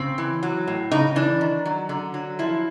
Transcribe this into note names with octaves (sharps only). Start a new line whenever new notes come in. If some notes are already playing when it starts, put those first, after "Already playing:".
Already playing: C#3 C4
E3
F#3
A2
C#3 D#4
E3 D4
D#3
F#3
D3
F#3
F3 E4